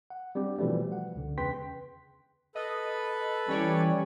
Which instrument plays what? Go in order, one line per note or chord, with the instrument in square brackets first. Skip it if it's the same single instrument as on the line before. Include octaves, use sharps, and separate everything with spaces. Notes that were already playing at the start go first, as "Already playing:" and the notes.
[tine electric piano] F#5
G3 C4 D4 G4
B2 E3 F3 G3 A3
F#5
C#2 D3
E2 C#3 B4 G5 C6 B6
[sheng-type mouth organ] A4 B4 B5 [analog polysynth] D#5
[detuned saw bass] E3 [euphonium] G3 [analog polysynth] C#4 C#5 D5